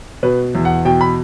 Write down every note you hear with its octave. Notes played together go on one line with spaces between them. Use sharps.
B2 B4
E2
F#5
B2 G5
B5